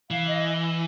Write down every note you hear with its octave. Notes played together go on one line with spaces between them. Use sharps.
E3 F5
D#5